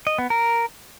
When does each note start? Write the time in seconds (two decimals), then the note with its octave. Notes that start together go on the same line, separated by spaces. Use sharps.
0.07 D#5
0.18 B3
0.30 A#4